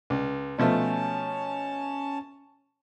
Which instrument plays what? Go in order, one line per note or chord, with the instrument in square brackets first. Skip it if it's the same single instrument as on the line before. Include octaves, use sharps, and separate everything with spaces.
[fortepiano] C#2
[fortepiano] B2 F3 A3 [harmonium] C#4 A5